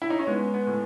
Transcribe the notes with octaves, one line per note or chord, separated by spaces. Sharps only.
E4
D#4
C#4
G#3 B3
B3
A2